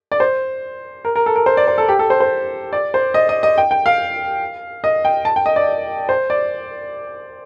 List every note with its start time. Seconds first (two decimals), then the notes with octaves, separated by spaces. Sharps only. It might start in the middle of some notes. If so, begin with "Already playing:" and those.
0.12 D5
0.20 C5
1.05 A#4
1.16 A#4
1.26 A4
1.36 A#4
1.46 C5
1.57 D5
1.68 C5
1.78 A4
1.89 G4
1.99 A4
2.10 C5
2.20 C5
2.73 D5
2.94 C5
3.14 D#5
3.29 D#5
3.43 D#5
3.58 G5
3.71 G5
3.86 F5
4.84 D#5
5.05 G5
5.25 A5
5.36 G5
5.46 D#5
5.56 D5
6.09 C5
6.30 D5